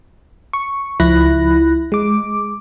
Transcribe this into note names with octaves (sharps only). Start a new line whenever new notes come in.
C#6
C#2 F3 E4 B5 F#6 A#6
G#3 D6